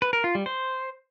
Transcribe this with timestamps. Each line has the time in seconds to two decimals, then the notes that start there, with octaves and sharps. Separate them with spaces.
0.02 B4
0.13 A#4
0.24 F4
0.35 G3
0.46 C5